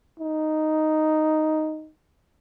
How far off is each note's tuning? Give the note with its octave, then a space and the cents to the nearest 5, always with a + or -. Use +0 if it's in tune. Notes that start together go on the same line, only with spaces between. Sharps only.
D#4 +0